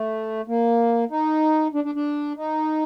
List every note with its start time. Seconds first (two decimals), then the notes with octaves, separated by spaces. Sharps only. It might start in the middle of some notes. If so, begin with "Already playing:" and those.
Already playing: A3
0.48 A#3
1.11 D#4
1.74 D4
1.84 D4
1.95 D4
2.37 D#4